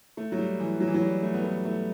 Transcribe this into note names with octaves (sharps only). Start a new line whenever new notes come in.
A3
F#3
G3
E3
F#3
E3
F#3
G3
A3
B3
A3
A3